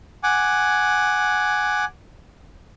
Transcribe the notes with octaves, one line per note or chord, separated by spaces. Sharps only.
F#5 G#5 D6